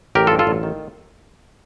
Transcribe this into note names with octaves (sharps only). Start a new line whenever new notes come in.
A1 G4 A#4
F4 A4
G2
F4 A4
A1
D#3